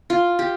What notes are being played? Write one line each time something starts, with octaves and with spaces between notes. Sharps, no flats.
F4
G4